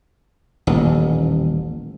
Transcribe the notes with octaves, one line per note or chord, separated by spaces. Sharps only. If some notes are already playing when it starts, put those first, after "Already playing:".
D#1 A1